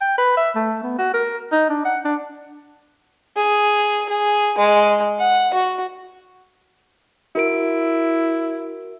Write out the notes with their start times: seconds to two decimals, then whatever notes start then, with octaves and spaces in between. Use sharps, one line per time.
0.01 G5
0.18 B4
0.37 E5
0.56 A3
0.83 B3
0.98 F#4
1.14 A#4
1.52 D#4
1.70 D4
1.85 F#5
2.05 D4
3.37 G#4
4.09 G#4
4.58 G#3
5.19 F#5
5.54 F#4
7.35 E4 F#4 A#4 D7